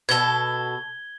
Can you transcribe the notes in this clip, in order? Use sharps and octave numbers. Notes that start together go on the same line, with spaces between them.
B2 A4 G#6 G7